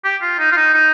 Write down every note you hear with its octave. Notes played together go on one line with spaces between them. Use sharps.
G4
F4
D#4
F4
D#4
D#4